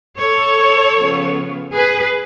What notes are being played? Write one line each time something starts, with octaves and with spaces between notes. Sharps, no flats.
A4 C#5
C#3 F3 B3
G#4 B4